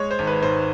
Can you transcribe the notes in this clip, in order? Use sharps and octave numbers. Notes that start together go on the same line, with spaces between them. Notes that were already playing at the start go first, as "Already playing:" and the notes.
Already playing: G#3 C#5
C5
G#1
B4
G#2 C5